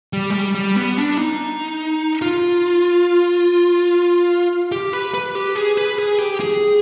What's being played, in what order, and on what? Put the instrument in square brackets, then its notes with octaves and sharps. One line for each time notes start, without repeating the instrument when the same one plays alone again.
[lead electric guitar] G3
G#3
G3
G3
B3
D4
D#4
F4
G4
B4
B4
G4
G#4
B4
G#4
G4
G#4